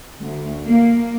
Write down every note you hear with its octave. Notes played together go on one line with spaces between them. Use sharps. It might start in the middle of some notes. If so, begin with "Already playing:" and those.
D2
A#3